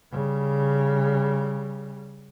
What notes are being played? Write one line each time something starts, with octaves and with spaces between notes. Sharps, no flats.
C#3 G3